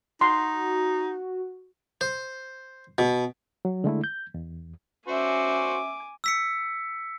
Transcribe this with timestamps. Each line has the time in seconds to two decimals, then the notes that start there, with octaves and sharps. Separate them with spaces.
0.21 D#4 F#4 C6
2.01 C5
2.98 B2
3.65 F#3
3.84 D3 G#3 A3 E4
4.04 G6
4.34 E2
5.08 C#4 F#4 C5 E5 G#5 D6
6.24 E6 B6 C#7